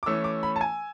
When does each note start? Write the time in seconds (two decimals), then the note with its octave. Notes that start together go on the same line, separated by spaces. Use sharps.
0.03 D6
0.06 E3 A3 C#4 E6
0.24 D6
0.43 B5
0.56 A5
0.61 G#5